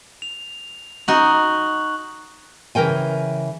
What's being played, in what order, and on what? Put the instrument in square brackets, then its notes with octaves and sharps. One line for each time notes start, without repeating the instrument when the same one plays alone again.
[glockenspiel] F7
[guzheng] D#4 F#4 [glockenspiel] C#6 F#6 F#7
[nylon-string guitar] C#3 E3 A#4 G5 G#5